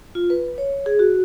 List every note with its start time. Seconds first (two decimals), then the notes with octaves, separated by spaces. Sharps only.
0.15 F4
0.30 B4
0.58 C#5
0.86 G#4
0.99 F#4